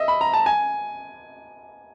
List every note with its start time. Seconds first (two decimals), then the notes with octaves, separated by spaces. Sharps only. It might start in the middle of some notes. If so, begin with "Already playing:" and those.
Already playing: D#5 E5
0.08 B5
0.21 A#5
0.33 A5
0.46 G#5